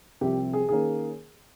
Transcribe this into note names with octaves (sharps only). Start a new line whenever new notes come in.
C2 C3 F3 C4 G4
G#4
D#3 A#3 C#4 G#4